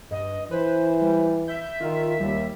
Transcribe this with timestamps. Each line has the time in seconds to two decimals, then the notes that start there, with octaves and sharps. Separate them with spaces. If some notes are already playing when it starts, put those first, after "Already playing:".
0.11 G2 D#5
0.51 E3 B4 C5
1.01 G3
1.48 E5 G6
1.81 D#3 F4
2.20 D#2 G3